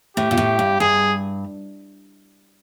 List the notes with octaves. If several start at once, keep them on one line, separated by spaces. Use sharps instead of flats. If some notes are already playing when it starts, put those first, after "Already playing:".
A2 G4
A#2
A2
G2
G2 G#4